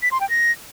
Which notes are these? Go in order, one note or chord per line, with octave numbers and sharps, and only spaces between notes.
B6
C6
G5
A#6